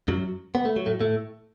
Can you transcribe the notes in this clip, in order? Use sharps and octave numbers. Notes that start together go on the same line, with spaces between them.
F#2 F#3
B3
A3
F#3
A2 A3
A2 A3